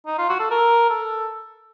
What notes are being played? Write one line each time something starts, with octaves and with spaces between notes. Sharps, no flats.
D#4
F4
F#4
A4
A#4
A4